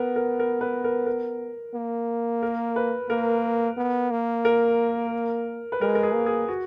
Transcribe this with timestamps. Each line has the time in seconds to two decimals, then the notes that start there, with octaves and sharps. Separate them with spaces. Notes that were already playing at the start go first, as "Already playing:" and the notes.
Already playing: B3 A#4 B4
0.16 A#4
0.40 A#4
0.61 B4
0.84 A#4
1.06 A#4
1.74 A#3
2.43 A#4
2.76 B4
3.09 A#3 A#4
3.77 B3
4.11 A#3
4.45 A#4
5.72 B4
5.81 G#3 A#4
5.95 A#4
6.03 G#4
6.14 A#3
6.26 G#4
6.48 F#4